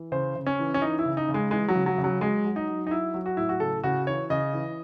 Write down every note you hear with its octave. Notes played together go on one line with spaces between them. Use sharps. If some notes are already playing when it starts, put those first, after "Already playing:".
Already playing: E3
C#3 C5
C#3
C#4
E3
C#4
E3 D#4
E4
C#3
D#4
C#3
G#3
E3 G#3
F#3
C#3
F#3
C#3
F#3
F#3 G#3
F#3
D#4
F#3
D#4
F#3 E4
F#3
F#4
A2 E4
F#4
C#3 A4
C#3 F#4
E3 C#5
C#3 D#5
E3